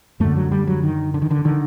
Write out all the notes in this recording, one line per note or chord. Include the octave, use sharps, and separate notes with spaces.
F#2 D3 A3
F#3
G3
F#3
D#3
D3
D#3
D3
D3 D#3